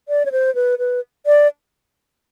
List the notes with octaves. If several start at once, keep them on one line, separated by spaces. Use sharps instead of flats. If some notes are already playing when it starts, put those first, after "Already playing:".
D5
C#5
C5
B4
B4
D5